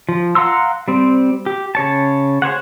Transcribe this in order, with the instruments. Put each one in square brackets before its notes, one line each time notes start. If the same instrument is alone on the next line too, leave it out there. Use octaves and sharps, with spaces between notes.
[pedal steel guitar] F3
F5 F#5 A#5 C6 E6
G3 C4
G4
C#3 C#5 A5
G#4 C5 C#5 F#5